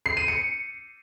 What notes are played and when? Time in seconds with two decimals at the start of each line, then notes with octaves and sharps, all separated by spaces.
0.06 C7
0.17 D#7
0.28 C#7